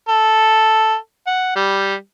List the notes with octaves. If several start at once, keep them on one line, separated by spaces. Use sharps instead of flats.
A4
F#5
G3